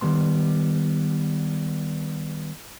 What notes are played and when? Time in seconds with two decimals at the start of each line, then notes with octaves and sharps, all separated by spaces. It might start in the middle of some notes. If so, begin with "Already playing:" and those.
0.01 D#3 G3 B3 C6